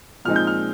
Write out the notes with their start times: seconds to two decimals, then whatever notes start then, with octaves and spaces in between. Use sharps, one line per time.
0.25 A#2 F3 G#3 C4 D#4 F6
0.36 G6
0.47 F6